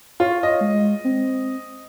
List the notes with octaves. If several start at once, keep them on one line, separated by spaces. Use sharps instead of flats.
F4 C#5
D#5
G#3
C4